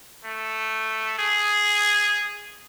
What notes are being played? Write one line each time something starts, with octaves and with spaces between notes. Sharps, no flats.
A3
G#4